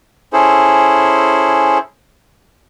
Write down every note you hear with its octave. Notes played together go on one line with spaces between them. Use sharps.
C#4 E4 G#4 A4 C5